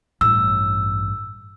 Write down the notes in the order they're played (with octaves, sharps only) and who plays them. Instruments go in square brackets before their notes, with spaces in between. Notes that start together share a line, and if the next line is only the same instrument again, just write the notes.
[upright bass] A1 G2 [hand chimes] E6